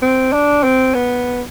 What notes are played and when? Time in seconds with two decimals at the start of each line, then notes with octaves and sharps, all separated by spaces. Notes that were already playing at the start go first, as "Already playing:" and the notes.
0.02 C4
0.32 D4
0.63 C4
0.94 B3